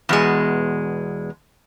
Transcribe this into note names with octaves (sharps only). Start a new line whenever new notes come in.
E2 B2 G#3